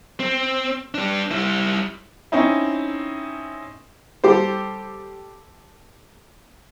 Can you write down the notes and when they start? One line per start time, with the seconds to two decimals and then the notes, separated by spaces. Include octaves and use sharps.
0.20 C4
0.94 G3 D4
1.31 G3 E4
2.32 C4 C#4 D#4 E4
4.24 G3 G4 A4 C5